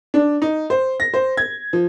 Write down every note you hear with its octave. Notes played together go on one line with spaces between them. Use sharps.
D4
D#4
C5
A#6
C5
G#6
F3